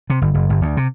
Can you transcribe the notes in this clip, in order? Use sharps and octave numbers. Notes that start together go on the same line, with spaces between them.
C3
G1
F#1
G1
D2
C3